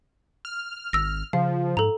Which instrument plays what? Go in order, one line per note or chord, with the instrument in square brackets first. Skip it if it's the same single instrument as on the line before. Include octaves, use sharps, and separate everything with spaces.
[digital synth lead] F6
[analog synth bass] G#1 [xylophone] E6 A#6
[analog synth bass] C#3 [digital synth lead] F3 [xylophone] F5
[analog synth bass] G#2 [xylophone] A4 A#5